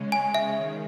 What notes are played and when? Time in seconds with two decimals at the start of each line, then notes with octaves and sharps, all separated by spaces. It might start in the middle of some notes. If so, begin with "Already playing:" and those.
Already playing: C#3 G#3 C#4
0.12 G#5
0.34 E5
0.57 D#3